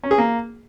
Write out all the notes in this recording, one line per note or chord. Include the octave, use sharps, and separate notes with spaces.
C#4
G#4
A#3